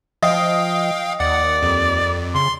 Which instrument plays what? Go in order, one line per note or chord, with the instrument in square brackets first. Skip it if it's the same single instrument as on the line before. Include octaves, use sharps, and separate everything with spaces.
[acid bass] F3 [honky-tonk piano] D#5 [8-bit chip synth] F5 G5
[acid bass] D#2 [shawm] D5 [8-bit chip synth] F#5
[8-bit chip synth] F2
[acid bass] C#3 [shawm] C6